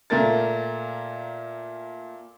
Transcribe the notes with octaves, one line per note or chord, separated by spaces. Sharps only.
A#2 A3 A#4 A6